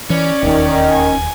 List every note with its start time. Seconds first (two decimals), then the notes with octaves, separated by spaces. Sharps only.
0.10 E3 C#4 D5
0.43 E1 D#2 D#3
0.89 G#5